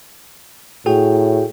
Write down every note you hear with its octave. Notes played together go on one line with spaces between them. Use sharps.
A2 F#4 G#4 G5